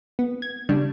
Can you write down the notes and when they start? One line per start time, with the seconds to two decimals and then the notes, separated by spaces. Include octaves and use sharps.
0.19 B3
0.42 G#6
0.69 C#3 G3 D4